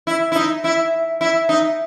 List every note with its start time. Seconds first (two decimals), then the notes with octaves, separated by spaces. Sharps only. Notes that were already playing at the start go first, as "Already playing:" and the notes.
0.07 E4
0.32 E4
0.36 D#4
0.64 E4
1.21 E4
1.49 D#4